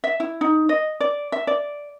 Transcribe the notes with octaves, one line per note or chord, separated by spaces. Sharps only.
E5
E4
D#4
D#5
D5
E5
D5